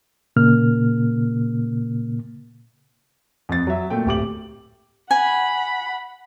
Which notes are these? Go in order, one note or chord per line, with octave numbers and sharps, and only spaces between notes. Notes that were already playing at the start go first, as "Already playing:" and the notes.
A#2 C#3 A#3 F6
F2 A6
F#3 E5
A#2 A3 G5
D1 G4 D6 F#7
F#5 G#5 B5